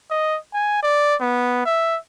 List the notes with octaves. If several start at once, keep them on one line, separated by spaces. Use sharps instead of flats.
D#5
G#5
D5
B3
E5